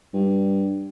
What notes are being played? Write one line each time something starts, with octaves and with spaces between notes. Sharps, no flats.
G2